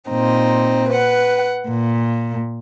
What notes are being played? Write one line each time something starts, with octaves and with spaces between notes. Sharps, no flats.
A#2 C4 D#4
B4 F#5
A#2